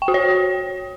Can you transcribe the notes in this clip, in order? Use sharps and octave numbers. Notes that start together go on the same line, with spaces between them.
G5
F#4
C#5